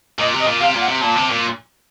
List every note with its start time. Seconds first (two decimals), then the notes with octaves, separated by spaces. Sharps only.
0.19 A#2 D#5
0.34 C3
0.39 D#5
0.47 A#2
0.60 C3 F5
0.75 A#2
0.80 F#5
0.88 C3
1.00 A#2 A5
1.16 C3
1.30 A#2